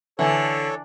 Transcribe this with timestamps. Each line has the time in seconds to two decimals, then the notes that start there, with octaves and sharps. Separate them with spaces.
0.19 D3 E3 A4 C#5